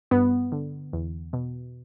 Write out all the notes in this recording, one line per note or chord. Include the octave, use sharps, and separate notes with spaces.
G2 B3
D3
E2
B2